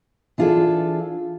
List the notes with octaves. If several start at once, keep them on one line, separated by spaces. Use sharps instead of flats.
E3 D4 F4 G#4 A4